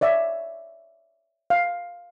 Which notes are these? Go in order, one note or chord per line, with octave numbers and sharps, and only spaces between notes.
C#5 D5 E5
F5